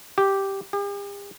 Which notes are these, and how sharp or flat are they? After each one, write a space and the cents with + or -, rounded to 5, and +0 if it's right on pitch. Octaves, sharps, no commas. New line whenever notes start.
G4 -5
G4 +45